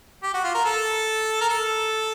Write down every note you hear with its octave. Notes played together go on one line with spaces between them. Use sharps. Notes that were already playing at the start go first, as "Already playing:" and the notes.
G4
F#4
F4
A#4
A4
A#4
A4